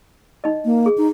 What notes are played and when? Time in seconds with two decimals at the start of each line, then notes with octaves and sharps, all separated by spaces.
0.44 D#4 D#5
0.65 A#3
0.86 G#4
0.98 D#4